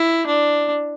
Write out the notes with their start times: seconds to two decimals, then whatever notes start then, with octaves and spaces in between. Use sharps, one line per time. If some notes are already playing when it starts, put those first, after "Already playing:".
Already playing: E4
0.26 D4